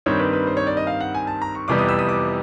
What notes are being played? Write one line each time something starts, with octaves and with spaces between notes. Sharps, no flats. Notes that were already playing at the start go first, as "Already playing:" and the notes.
G2 D#3 G3 C4 C#5
B4
B4
C5
C#5
D5
D#5
F5
F#5
G#5
A5
A#5
C#6
F2 C3 E3 G3 B3 D6
D#6
E6
D#6
D6